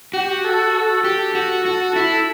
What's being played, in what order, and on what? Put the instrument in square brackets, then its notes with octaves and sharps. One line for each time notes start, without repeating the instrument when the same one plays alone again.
[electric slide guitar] F#4 [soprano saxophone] G4
[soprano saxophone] A4
A4
[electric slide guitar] G4
F#4
F#4
E4